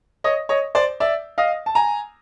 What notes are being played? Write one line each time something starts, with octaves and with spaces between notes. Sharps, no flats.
C#5 D#5
C#5 D#5
C5 D5
D5 E5
D#5 F5
A5
G#5 A#5